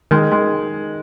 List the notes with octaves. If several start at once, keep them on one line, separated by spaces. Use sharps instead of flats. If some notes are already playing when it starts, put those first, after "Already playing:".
D#3 G#3
G#3